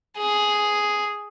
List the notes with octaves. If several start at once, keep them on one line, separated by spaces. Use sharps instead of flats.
G#4